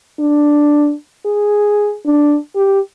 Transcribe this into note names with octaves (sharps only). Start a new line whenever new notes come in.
D4
G#4
D4
G4